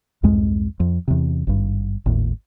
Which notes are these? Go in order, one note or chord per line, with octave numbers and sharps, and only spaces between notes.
C2 F2 G#2 G#3
F2
E2 C3
G#1 G2
G#1 D#2 A2